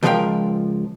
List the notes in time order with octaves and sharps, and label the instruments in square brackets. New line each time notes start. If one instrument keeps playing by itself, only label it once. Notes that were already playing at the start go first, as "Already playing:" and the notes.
[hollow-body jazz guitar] C#2 F3 G#3 A#4 F5 G5